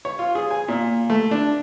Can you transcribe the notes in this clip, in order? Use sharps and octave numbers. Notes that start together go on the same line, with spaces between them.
C#5
F4
G#4
G#5
A#2
A3
D4